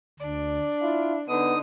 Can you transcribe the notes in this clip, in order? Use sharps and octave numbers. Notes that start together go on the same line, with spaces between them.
D2 D4 D5
E4 F4
D3 B3 D#4 D#6